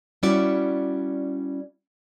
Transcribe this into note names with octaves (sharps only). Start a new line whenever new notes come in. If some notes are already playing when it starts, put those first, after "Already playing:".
G3 C#4 E4 F#4 D5